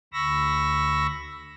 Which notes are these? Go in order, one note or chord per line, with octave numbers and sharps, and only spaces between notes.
D2 B5 C#6 E6 A#6